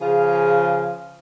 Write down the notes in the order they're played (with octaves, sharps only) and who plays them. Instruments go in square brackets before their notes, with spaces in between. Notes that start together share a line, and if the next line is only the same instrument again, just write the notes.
[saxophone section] C#3 F3 F4 G#4 F5